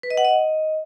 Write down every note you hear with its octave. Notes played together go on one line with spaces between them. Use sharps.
B4
D#5
F#5
D#5